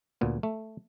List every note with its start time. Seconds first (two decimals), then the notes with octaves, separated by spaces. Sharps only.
0.21 D2 A#2 B3
0.43 A3